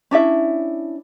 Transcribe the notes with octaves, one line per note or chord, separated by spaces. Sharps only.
C#4 D4 E4 E5